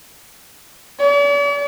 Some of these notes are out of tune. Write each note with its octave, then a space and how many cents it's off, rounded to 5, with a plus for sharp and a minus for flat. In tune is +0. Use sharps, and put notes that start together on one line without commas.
D5 -45